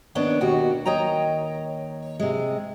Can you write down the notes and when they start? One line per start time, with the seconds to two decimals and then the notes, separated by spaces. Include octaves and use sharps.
0.15 D#2 B3 C#4 D4
0.41 D#2 B2 F#4 G4
0.85 D#2 C#5 D#5 G5 A#5
2.20 C3 G#3